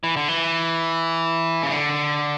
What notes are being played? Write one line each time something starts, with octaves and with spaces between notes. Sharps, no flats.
E3
D3
E3
C#3
D3